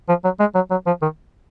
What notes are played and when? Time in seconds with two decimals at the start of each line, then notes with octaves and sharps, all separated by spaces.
0.09 F3
0.24 F#3
0.40 G#3
0.55 F#3
0.71 F#3
0.87 F3
1.02 D#3